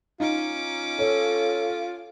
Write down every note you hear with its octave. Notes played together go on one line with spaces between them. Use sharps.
C#4 D#4 F4 D6
A4 C#5